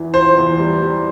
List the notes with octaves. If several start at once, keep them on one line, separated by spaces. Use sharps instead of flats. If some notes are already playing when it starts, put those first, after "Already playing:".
Already playing: E2 E3
F4 C5
E2
G3
G3